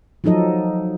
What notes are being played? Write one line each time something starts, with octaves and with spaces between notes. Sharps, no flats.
F3 F#3 D#4 A4 D#5